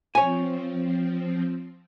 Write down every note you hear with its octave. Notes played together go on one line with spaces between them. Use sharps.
F3 C4 C#5 G#5